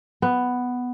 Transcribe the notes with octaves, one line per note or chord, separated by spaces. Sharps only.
B3